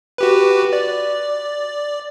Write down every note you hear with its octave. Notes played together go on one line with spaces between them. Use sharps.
F#4 G4 B4
D5